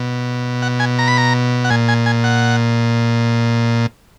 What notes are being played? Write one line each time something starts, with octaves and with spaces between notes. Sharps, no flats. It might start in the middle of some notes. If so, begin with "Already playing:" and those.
Already playing: B2
F#5
G#5
A#5
B5
A#5
F#5
A#2 G#5
G#5
G#5
F#5